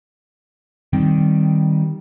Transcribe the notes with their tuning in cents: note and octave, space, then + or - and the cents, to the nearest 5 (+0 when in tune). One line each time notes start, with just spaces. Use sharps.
D#3 +0 G3 +0 C4 +0